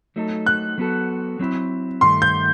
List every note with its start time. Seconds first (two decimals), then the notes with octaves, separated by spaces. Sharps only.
0.16 F#3 A3 D#4 A4
0.46 F#6
0.78 F#3 B3 F#4 A4
1.39 F#3 C4 E4
2.01 G2 D#3 A3 C6
2.22 G6